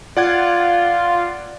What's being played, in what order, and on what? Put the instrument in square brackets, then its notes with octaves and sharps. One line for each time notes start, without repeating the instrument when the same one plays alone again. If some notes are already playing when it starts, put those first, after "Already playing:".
[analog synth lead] F4 [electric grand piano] D5 F#5 G#6